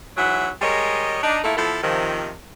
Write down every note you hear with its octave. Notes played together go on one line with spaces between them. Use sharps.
G#2 E3 F#3 E5 F#5
G3 G#3 A#4 C#5 D#5
D4 D#4
A3 A#3 E4 F4 A4 E5
F3 B3 E4 A4
C3 D#3 F3